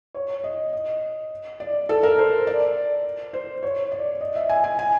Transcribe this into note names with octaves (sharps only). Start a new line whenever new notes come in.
C#5
D#5
D#5
D5
A4
A#4
C5
D5
C5
C#5
D5
D#5
E5
G#5
G#5
G#5